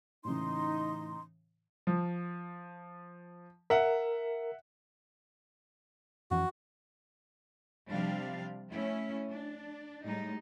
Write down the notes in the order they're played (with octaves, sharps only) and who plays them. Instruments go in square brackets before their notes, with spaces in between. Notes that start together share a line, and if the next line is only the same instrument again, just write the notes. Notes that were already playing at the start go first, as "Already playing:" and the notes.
[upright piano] A2 C#3 E3 [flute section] D#4 C6
[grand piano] F3
[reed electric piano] A#4 [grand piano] E5 F#5
[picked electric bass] F2 E3 C#4 [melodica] F#4
[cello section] C3 F3 G3 D4 F5
A3 C#4 E4
D4
A2 G3 G#3 D#4